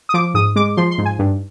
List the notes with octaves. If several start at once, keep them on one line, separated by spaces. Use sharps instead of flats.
D#6
F3 D6
G#2 D#6
G#3 D6
F3 C6
C6
G#2
G#5
G2